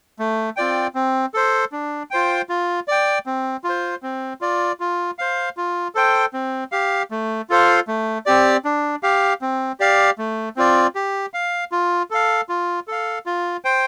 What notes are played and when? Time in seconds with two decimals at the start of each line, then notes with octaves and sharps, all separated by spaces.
0.19 A3
0.57 C4 F4 D5 G5
0.95 C4
1.34 A4 C5
1.72 D4
2.11 F4 C5 G5
2.49 F4
2.88 D5 G5
3.26 C4
3.64 F4
3.69 C5
4.03 C4
4.41 F4 D5
4.80 F4
5.19 C5 F5
5.57 F4
5.95 A4 C5 G5
6.33 C4
6.72 G4 F5
7.11 A3
7.50 F4 A4 C5 F5
7.88 A3
8.26 C4 G4 D5
8.65 D4
9.03 G4 F5
9.42 C4
9.80 G4 D5 F5
10.18 A3
10.56 C4 F4 D5
10.95 G4
11.34 F5
11.72 F4
12.11 A4 F5
12.49 F4
12.88 A4 F5
13.26 F4
13.65 C5 G5